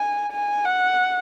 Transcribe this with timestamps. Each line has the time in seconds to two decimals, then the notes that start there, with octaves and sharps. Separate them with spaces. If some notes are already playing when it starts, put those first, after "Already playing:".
Already playing: G#5
0.32 G#5
0.65 F#5